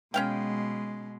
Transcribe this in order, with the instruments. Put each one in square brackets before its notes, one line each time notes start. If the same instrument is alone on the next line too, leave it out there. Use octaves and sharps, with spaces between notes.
[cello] B2 G#3 [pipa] C#4 F5 G5